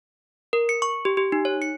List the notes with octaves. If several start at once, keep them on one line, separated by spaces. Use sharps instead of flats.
A#4
C#7
C#6
G4
G4
D#4
C#5
C#7